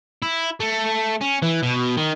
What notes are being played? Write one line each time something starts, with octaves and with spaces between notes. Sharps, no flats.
E4
A3
C#4
E3
B2
D#3